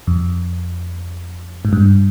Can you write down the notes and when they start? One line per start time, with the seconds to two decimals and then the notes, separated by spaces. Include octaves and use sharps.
0.07 F2
1.65 G#2
1.73 G2